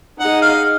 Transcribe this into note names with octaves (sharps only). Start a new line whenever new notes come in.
D#4 G#4 D#5 F#5
F5